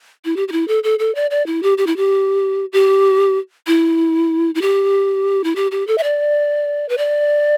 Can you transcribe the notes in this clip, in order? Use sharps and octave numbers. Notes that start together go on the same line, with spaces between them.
E4
G4
G4
E4
A4
A4
A4
D5
D5
E4
G4
G4
E4
G4
G4
E4
E4
G4
E4
G4
G4
A4
E5
D5
B4
D5